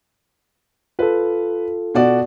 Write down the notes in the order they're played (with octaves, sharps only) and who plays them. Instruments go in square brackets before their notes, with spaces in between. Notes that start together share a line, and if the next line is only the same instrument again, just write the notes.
[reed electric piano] F4 A4 [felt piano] B4
[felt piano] B2 F#4 D5